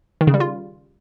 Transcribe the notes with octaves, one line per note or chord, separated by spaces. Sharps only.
D#3
C#3
G3
F4